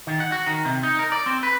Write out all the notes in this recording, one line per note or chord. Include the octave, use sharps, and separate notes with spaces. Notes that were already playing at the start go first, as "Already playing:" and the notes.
D#3
F#5
F#4
D#3
C3
D#4
A#4
D5
C4
B4